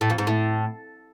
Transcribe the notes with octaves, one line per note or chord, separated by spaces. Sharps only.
A2
F2
G#2
A2